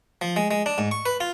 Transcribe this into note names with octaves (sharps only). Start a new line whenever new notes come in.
F3
G#3
G#3
D4
G#2
C#6
B4
F4